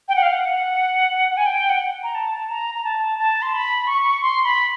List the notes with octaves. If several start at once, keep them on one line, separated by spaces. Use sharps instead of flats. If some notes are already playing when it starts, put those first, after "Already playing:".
G5
F#5
F5
F#5
G#5
G5
F#5
A#5
A5
A#5
A#5
A5
A5
C6
B5
C#6
C6
B5